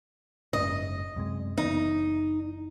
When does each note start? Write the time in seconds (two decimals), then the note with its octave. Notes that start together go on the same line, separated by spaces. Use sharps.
0.53 F#1 G#2 C#3 D#5
1.16 F#2 C3 G#3
1.58 F#1 E3 B3 D#4